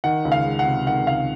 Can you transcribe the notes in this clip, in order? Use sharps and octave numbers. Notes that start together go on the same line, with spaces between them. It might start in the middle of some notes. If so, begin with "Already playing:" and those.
D#3 F#5
C#2
F5
G#3
F#5
C3
D#3 F#5
C#2 F5